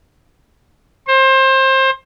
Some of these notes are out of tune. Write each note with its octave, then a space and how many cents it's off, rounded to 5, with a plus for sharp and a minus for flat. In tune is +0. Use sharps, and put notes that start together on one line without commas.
C5 +25